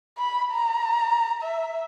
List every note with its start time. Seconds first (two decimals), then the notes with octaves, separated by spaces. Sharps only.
0.18 B5
0.52 A#5
1.42 E5